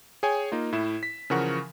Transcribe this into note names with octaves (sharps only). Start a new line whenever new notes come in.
G#4 C#5 G5 G#5
A#3 D#4 F4
A2 E4 E7
B6
C#3 E3 F3 A#4 F#5 C#6